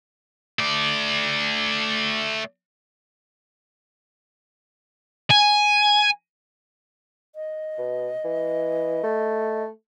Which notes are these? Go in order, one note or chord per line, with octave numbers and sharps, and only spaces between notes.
A3 D5
G#5
D#5
B2
E3
A3